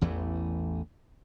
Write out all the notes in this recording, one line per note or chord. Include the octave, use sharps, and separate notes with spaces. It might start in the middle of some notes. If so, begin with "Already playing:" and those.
A1 E2 E3 A3